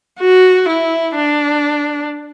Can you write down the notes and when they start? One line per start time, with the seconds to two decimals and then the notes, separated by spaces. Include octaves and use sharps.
0.20 F#4
0.69 E4
1.16 D4